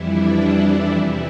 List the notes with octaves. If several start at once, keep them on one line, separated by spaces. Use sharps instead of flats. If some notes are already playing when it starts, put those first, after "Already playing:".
Already playing: F2 E3 G3 E4
D4
D4
E2 C3 E3 G3 E4